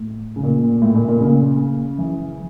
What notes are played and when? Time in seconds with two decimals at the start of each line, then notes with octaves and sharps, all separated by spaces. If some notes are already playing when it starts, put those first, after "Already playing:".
Already playing: A2
0.36 C#3
0.43 A#2
0.82 A2
0.95 A#2
1.08 A#2
1.20 C#3
1.98 E3